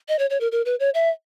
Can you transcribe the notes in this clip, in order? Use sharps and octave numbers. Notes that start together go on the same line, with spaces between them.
D#5
C#5
C#5
A#4
A#4
B4
C#5
E5